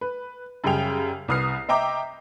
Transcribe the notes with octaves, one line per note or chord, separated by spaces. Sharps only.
B4
F#2 C#3 G3 G#4 G5 F7
C2 B4 D#6 F6 C7
D#5 E5 G5 A#5 D6